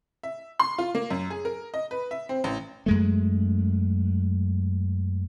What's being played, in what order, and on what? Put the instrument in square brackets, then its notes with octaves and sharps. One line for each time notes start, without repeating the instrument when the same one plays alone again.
[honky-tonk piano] E5
C6
F4
A#3
F#2
G#4
A#4
D#5
B4
E5
C4
A1
[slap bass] F#2 G#3 A3